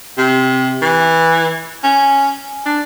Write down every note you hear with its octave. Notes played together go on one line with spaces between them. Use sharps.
C3
E3
C#4
D4